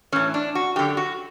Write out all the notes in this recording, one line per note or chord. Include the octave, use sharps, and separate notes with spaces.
A2 E3 C#4
D4
F#4
F#2 D3 G4
F#4